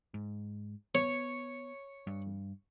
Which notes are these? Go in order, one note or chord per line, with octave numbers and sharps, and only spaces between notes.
G#2
B3 C#5
G2